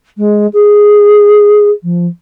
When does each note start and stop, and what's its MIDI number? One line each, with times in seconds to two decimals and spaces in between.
0.17 0.46 56
0.53 1.69 68
1.82 2.05 53